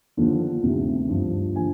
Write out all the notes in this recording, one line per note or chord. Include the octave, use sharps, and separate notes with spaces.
D#2 D3 F3
D2 C3 D#3
G2 F3
D3 F3 G#5